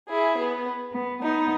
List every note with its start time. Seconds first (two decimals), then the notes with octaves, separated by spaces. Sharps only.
0.08 E4 G#4
0.37 B3
0.94 B3
1.23 B3 D#4